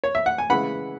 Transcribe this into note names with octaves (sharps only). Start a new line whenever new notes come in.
C#5
E5
F#5
G#5
C#3 E3 G#3 F#5 B5